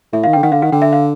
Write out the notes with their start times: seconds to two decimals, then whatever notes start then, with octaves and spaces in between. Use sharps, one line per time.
0.13 A2 E5
0.24 F5
0.27 D#3
0.33 G5
0.37 D3
0.43 D#3 F#5
0.52 D3 F5
0.62 D#3 F#5
0.72 D3 G5
0.82 E5
0.93 F5